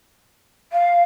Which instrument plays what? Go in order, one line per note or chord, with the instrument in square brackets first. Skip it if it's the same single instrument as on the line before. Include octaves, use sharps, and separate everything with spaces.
[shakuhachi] F5